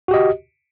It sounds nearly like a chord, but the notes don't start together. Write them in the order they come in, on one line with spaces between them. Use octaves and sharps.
F#4 G4 D#5